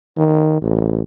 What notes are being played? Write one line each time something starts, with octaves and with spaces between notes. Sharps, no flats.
D#3
A1